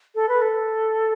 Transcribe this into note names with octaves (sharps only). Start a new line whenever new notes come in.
A4
B4
A4